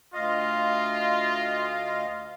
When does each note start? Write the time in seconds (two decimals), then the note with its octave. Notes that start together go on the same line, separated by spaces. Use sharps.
0.14 D2 F4 D#5 F5